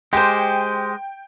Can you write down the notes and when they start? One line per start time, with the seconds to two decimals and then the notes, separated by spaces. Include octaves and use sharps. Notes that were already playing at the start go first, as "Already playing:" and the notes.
0.13 G#3 G4 C5 G5